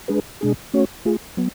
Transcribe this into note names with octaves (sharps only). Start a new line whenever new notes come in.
G#3 D4 G#4 B4
B2 G#3 D4 G#4
A3 C#4 F#4 C#5
A3 F4 G#4
F#3 B3